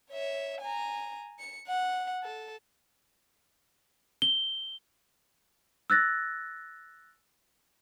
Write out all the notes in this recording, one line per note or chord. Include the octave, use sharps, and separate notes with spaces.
C#5 E5
G#5 A#5
C#7
F#5
A4
G7
E6 F#6 A6 A#6